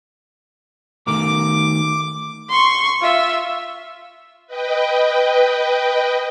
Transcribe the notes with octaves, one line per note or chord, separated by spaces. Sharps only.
D#3 A3 A#4 D6
C6 C#6
F4 E5
B4 D#5 G5